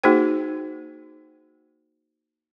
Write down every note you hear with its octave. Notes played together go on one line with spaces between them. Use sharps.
A#3 D#4 F#4 G#4 C5 G5